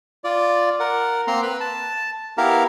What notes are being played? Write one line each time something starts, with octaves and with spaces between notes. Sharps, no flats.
F4 D5
A#4 F#5
A#3 C4 A#5 C6
B4 B5
A5
B3 E4 G4 A#4 F5 A#5